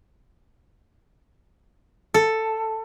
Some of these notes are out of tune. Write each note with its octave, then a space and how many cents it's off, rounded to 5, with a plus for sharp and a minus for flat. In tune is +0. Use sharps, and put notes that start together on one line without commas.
A4 +5